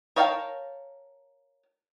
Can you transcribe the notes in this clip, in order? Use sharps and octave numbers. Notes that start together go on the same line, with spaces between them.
A#4 C#5 F5 G5 A5